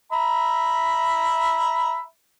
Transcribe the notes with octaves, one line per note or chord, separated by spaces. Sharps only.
E5 A#5 B5